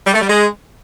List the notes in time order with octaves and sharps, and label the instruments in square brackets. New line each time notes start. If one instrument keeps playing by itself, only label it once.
[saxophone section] G3
A3
G3
G#3